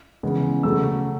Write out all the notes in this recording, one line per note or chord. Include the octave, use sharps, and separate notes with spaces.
C#3 E3 G#3 B3
C#3 F#3 A3 C#4 E6